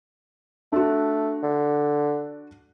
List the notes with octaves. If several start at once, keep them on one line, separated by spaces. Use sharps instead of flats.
A3 D4 F#4
D3